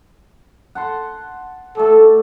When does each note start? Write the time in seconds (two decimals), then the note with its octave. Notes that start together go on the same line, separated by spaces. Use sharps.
0.75 F#5 A5 C6
1.77 A3 A4 D5